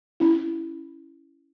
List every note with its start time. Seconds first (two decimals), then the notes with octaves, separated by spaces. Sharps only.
0.20 C#4 E4